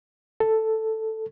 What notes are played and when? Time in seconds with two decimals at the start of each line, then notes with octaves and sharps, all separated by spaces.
0.40 A4